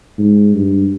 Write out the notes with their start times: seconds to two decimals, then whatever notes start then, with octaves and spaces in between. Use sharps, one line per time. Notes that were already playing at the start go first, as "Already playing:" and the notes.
0.18 G#2
0.54 G2